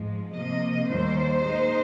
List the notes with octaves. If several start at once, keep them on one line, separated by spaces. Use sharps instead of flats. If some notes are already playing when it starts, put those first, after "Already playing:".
Already playing: G#2 F3 G#3
C3 F3 A#3 D#5
D#2 D#3 G3 A#3 C5
A#2 G#3 D#4